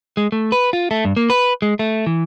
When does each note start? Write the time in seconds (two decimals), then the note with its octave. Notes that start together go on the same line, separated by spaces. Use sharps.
0.17 G#3
0.32 A3
0.52 B4
0.73 F4
0.91 A3
1.05 G2
1.17 A#3
1.30 B4
1.62 G#3
1.79 A3
2.06 E3